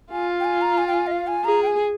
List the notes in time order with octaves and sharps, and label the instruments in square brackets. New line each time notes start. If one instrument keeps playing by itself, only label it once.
[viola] F4 [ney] G#5
[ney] G5
G#5
A#5
G#5
G5
G#5
D#5
F5
G#5
[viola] G#4 [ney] A#5
[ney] G5
G#5